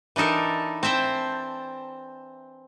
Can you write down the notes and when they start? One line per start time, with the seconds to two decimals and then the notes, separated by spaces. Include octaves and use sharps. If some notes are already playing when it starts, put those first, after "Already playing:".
0.16 E3 D4 D#4 A4 A#4
0.83 C4 C5 E5 G5 A5